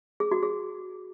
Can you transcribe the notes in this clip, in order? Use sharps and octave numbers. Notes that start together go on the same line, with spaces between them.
G#4
F#4
G#4